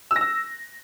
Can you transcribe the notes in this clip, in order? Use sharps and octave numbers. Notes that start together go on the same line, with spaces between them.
E6
A#6
E6